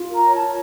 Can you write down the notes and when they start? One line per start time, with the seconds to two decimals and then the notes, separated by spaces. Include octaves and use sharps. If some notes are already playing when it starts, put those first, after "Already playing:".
Already playing: F4
0.08 A#4
0.14 A#5
0.24 C#5
0.35 F4 A5